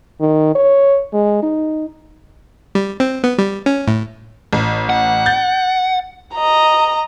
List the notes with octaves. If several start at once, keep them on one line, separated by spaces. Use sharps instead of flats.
D#3
C#5
G#3
D#4
G3
C4
B3
G3
C#4
A2
A1
F#5
G6 A6
D#5 A#5